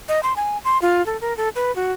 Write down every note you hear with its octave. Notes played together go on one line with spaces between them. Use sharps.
D#5
C6
G#5
C6
F4
A4
A#4
A4
B4
F#4